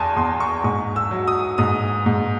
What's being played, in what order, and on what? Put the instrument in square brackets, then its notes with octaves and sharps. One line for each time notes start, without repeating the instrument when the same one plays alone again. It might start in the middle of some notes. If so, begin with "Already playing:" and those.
Already playing: [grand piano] E2 G#5 A5 C6 C#6
E2 C6
C#6
G#2 C#6
E6
F#3
D#6
G#2 D#6
G#2